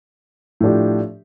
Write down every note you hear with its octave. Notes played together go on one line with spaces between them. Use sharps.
A2 F3 D4 G4